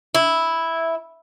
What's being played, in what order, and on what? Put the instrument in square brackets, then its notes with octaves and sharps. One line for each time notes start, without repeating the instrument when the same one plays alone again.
[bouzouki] E4